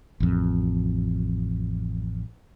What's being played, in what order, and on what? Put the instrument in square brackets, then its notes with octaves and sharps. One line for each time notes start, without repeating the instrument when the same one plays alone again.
[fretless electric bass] A1 F2